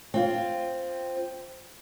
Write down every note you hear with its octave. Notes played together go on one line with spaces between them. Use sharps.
C4 F4